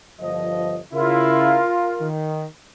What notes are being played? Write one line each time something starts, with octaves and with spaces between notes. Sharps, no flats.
G1 F3 D#5
C#3 E4 F4 A#4
D#3